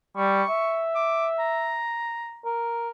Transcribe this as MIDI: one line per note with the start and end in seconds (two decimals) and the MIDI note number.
0.17 0.43 55
0.17 0.83 85
0.49 1.81 76
0.95 1.27 86
1.39 2.43 82
2.45 2.89 70